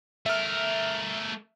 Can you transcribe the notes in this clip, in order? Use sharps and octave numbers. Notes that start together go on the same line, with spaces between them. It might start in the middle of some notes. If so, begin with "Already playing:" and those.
A3 A#4 E5 F6